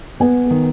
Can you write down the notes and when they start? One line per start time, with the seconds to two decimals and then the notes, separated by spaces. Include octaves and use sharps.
0.20 B3 G#5
0.51 D#3